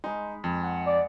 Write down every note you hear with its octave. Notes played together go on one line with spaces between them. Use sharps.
G#3 D#4 B5
F2
F#5
D5